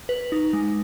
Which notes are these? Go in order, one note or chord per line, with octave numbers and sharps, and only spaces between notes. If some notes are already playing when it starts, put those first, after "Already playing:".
B4
D#4
G#3